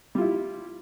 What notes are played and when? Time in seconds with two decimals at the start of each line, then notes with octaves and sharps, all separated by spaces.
0.15 G3
0.18 F4
0.21 E4